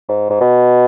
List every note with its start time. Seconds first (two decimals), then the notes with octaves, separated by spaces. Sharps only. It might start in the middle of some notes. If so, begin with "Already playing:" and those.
0.09 G#2
0.30 G#2
0.41 B2